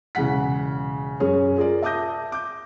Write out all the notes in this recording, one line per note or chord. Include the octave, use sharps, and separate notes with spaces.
E1 C#3 E3 F#5 B6
F#2 C#4 G#4 C#5
F4 G#4 A#4 D5
E5 A5 D6 D#6 G6 A#6
D6 G6